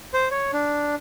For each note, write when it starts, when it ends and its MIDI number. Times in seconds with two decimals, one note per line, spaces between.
0.14 0.28 72
0.31 0.51 73
0.53 0.95 62